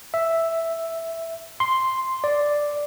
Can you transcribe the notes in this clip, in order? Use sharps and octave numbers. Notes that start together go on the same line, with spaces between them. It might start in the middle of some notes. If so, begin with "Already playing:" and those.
E5
C6
D5